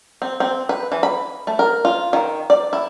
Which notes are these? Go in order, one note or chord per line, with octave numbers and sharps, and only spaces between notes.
C4
C4
B4
E3
B5
A3
A#4
F4
D#3
D5
E4